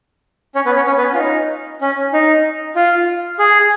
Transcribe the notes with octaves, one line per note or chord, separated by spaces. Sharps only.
C#4 C#5
B3 B4
C#4 C#5
C#4 C#5
B3 B4
C#4
F4
D#4
C#4
D#4
F4
G#4